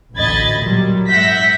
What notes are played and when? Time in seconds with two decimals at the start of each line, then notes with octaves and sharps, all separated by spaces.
0.15 A1 D2 D#5 B5 G#6 A6
0.61 A#2 F#3 G3
1.09 G#2 E5 F#5 G6 A#6 B6